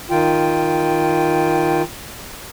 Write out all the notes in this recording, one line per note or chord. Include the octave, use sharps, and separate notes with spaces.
D#3 F4 G5